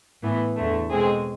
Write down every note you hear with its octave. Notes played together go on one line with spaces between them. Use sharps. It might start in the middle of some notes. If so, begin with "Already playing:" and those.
A2 E3 B3
E2 D3 A3
B2 G#3 C4 G#4